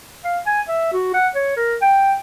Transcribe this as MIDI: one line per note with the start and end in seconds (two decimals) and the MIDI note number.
0.24 0.38 77
0.46 0.61 80
0.68 0.91 76
0.93 1.13 66
1.14 1.27 78
1.35 1.52 73
1.56 1.75 70
1.82 2.15 79